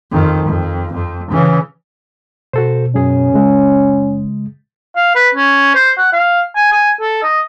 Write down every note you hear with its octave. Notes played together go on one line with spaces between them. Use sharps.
F2 D#3
F2
F2
C#3 E3
B2 F#4 A4 C5
F#2 C#4 G#4
F#1 C#3 G#3
F5
B4
C#4
C5
F#5
F5
G#5
G#5
A4
D#5